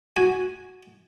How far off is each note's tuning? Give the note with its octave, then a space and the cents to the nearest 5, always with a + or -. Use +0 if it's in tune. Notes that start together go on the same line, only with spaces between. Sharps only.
F#4 +0 G#5 +0